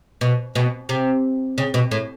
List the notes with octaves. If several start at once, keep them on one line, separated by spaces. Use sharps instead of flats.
B2
B2
C3
C#3
B2
A2